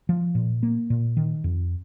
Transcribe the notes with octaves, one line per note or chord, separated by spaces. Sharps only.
F3
A#2
A#3
A#2
D#3
F2